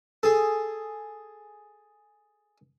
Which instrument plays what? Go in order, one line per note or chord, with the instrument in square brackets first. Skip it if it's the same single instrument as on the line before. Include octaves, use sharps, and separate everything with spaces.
[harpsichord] G#4 A4